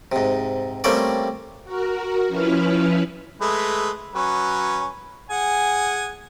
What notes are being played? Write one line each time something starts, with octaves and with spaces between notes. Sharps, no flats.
G#2 C3
G3 A3 A#3 C4 C#4 D5
F#4 A#4
F3 C#4 E4 B4 F6
G#3 A3 B4
F#3 C#4 B4
G#4 F#5 G#5